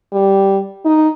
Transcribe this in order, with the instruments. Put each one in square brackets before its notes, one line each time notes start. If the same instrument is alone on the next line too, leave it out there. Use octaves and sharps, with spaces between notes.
[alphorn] G3
D#4